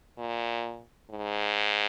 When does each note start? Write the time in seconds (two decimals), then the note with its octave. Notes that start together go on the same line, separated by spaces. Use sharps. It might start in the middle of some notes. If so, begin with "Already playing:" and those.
0.18 A#2
1.11 G#2